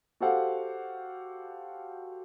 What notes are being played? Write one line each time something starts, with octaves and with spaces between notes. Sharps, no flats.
F#4 G4 A4 C5 F5 F#5